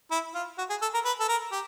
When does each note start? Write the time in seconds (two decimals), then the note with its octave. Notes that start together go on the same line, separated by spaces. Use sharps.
0.11 E4
0.35 F4
0.58 F#4
0.70 G#4
0.82 A4
0.94 A#4
1.05 B4
1.20 A4
1.29 A#4
1.52 G4